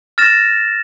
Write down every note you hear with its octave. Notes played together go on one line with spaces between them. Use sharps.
F6 A6 A#6 E7